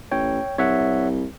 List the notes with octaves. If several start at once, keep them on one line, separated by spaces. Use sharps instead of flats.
A1 C#5 G5
C2 C#5 E5 F#5